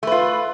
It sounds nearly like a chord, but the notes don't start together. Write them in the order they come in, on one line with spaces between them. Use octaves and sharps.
A3 B4 F4